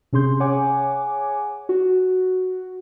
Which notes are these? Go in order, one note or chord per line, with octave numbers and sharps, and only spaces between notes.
C3 C#4 G#4 C6 G6
G#4 C#5 F#5 G#5 D6
F#4